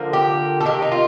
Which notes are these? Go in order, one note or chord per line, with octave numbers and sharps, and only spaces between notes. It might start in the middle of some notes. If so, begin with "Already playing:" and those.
Already playing: D3 F3 A#3
G4
A4
C3 D#3 A#3 G4
D#4
F4